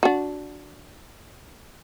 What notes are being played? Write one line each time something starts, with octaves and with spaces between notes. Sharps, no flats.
D4 F#4